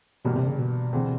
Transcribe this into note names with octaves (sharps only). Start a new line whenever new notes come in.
G1 G2 B2 E3 G3 A#3
C3
C#3
B2
D2 C3 E3 G#3 C4